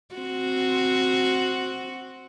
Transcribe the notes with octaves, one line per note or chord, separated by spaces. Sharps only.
C4 F#4